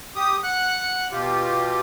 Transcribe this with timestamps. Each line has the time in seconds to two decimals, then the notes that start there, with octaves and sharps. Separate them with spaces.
0.16 G4 D#6
0.43 F#5 F#6
1.12 B2 F4 G4